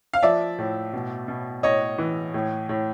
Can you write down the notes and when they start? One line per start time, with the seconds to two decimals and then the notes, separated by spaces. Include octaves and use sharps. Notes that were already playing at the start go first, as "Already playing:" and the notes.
0.14 F5
0.23 F3 D5 E5
0.59 A2
0.93 B2
1.28 B2
1.63 A2 C#5 D#5
1.98 E3
2.34 A2
2.69 A2